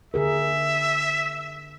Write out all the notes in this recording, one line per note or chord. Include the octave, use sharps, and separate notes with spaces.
D3 G#4 A#4 E5